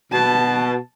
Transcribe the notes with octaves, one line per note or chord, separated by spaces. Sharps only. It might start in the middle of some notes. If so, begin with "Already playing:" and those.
B2 A5